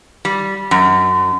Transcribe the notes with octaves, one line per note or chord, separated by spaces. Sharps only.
G3
F#2